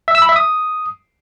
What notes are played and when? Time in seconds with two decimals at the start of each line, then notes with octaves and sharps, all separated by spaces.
0.08 E5
0.15 E6
0.22 B5
0.29 E5
0.36 D#6